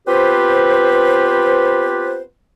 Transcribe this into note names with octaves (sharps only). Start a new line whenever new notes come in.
B3 C4 F4 G4 B4 C5